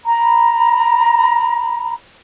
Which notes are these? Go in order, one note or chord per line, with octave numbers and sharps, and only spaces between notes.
A#5 B5